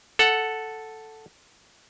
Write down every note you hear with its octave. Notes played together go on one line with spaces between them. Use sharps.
A4 F#5